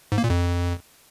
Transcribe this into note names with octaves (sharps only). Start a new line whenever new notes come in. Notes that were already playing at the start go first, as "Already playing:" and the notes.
G#2
A#3
A#2
F2